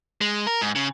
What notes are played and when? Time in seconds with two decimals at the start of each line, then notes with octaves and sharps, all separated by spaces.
0.21 G#3
0.47 A#4
0.61 G#2
0.76 C#3